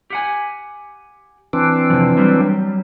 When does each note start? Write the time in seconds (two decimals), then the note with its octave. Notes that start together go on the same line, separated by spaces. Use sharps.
0.10 G4 F#5 G#5
1.53 E3 C4 D4
1.90 C3 F3
2.17 F#3 G3